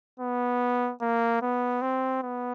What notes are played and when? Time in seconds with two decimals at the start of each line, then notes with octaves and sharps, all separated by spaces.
0.20 B3
1.02 A#3
1.42 B3
1.82 C4
2.23 B3